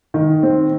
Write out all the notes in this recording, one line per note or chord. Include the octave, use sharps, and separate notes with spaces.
D#3
C4